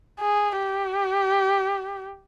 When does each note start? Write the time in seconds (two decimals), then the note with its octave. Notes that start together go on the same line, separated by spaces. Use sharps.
0.21 G#4
0.59 G4